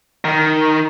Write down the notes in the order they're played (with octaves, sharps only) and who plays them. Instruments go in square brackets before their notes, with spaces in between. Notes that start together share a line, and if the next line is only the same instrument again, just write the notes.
[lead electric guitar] D#3